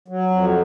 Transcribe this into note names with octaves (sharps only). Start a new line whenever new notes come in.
F#3
F2